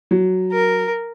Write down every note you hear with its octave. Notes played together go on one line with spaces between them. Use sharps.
F#3
A#4